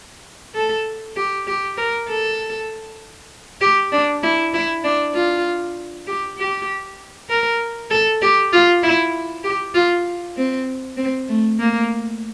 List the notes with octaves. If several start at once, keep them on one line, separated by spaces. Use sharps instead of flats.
A4
G4
G4
A#4
A4
G4
D4
E4
E4
D4
F4
G4
G4
A#4
A4
G4
F4
E4
G4
F4
C4
C4
A3
A#3